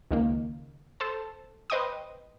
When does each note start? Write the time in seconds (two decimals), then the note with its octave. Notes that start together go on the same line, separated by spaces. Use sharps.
0.11 C#2 D#3 A#3
1.00 A4 C5 A5
1.70 B4 C5 D#5 G5 C#6 D#6